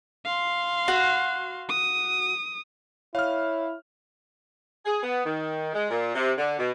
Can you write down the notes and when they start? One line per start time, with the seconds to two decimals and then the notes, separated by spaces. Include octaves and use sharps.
0.25 F5 C6
0.88 F#4
1.69 D#6
3.15 E4 C#5 F5 F6
4.86 G#4
5.03 B3
5.26 D#3
5.74 G#3
5.90 A#2
6.15 C3
6.38 D3
6.59 B2